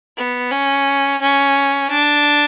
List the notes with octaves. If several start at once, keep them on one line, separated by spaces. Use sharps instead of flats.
B3
C#4
C#4
D4